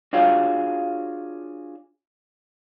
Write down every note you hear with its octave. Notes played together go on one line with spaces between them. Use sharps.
D4 F4 F#4 G#4 C#5 F5